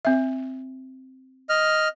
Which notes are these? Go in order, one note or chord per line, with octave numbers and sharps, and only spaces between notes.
C4 E5
D#5 F6